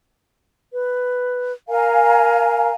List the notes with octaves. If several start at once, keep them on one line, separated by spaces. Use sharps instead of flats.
B4
A#4 F5 G#5 A#5